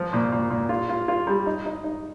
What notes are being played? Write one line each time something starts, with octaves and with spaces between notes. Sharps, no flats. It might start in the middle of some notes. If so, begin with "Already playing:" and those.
Already playing: F3
A#2
A#2
A#2
F4
F4
F4
G3
D#4
D#4
D#4